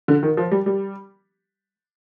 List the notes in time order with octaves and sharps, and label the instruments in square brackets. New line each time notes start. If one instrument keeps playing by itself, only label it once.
[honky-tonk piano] D3
D#3
F3
G3
G3